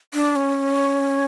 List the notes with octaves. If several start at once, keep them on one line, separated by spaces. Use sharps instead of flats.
D4
C#4